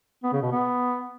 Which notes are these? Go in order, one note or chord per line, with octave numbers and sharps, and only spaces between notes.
B3
C#3
B2
B3